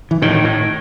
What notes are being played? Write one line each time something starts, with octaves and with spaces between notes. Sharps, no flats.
E3
A2 D#3
A2